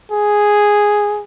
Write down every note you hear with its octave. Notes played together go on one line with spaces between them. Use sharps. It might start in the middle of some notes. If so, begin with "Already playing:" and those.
G#4